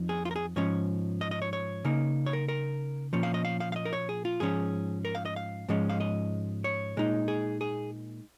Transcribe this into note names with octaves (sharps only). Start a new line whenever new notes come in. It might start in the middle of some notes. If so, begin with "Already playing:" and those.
Already playing: F2 F3 D#4
G#4
F4
A#4
G#4
G#2 F3 C#4 C#5
D#5
D#5
C#5
C#5
C#3 A#3 D#4
C#5
A#4
A#4
A#2 F3 C#4
F5
D#5
F5
F5
F5
D#5
A#4
C#5
G#4
F4
G#2 F3 C#4 G#4
A#4
F5
D#5
F5
G#2 F3 G#3 C#4
F5
D#5
C#5
A#2 G#3 D#4
G#4
G#4